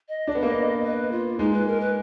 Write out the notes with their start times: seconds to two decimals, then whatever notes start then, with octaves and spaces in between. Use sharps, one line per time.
0.08 D#5
0.27 D4
0.35 B3
0.43 A#3
0.50 B3
0.83 B4
1.12 F4
1.39 G#3 D#4
1.53 B4
1.67 A#4
1.80 B4